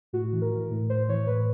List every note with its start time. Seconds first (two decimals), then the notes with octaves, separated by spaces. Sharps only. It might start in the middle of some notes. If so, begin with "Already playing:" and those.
0.13 A2 F#4
0.33 E3
0.42 A#4
0.51 E3
0.71 A2
0.90 A2 C5
1.08 E3 C#5
1.27 A2 B4